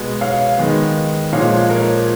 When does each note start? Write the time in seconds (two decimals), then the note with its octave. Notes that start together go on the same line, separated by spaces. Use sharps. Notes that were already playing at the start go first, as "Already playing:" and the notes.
Already playing: B2 G#3 B3
0.21 C#5 F5
0.58 D#3 G#3 B3
1.32 A#2 F3 G#3 C#5 F5
1.69 A#4 C#5